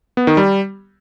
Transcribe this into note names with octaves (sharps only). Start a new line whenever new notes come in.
B3
D#3
G3